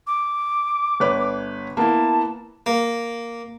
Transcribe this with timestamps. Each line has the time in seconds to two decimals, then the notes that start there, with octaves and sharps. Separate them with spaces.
0.07 D6
1.00 G1 B4 C#5
1.77 A#3 B3 E4 A5
2.66 A#3